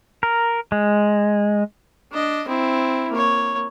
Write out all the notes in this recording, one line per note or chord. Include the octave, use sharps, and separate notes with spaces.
A#4
G#3
D4 D#5
C4 E4
A#3 C#5